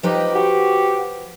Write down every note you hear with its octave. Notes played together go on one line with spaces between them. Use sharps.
F3 D#4 G4 B4 G5
F#4 G4